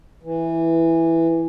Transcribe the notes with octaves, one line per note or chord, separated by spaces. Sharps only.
E3